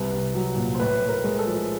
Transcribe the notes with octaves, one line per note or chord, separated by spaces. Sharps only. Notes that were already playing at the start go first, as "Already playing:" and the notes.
Already playing: C2 B4
C2
F#3
A#2
C5
A2 B4
A2
A#4
G#3
A4
F3